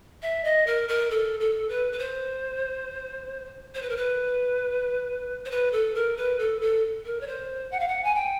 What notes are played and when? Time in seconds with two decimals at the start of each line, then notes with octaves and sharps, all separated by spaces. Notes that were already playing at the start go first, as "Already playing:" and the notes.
0.22 E5
0.44 D#5
0.67 A#4
0.89 A#4
1.11 A4
1.40 A4
1.69 B4
1.92 B4
1.99 C5
3.75 C5
3.82 B4
3.89 A#4
3.97 B4
5.45 C5
5.51 B4
5.72 A4
5.95 A#4
6.17 B4
6.39 A4
6.61 A4
7.05 A#4
7.21 C#5
7.27 C5
7.71 F#5
7.80 F5
7.88 F#5
8.04 G#5
8.15 G5